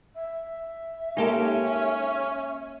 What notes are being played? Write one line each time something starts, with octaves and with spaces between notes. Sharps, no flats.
E5
G#3 A#3 C#4 D#4 G4 A4